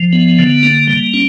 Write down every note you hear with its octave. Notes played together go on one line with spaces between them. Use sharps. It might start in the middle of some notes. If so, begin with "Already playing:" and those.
Already playing: F3
B3
D3
A#3
G3
C#4